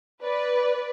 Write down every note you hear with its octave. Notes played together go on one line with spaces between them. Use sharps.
B4 D5